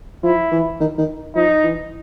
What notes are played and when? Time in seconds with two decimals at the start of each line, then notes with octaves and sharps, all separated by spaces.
0.23 F3 E4
0.52 E3
0.80 D#3
0.98 D#3
1.36 F3 D#4
1.64 E3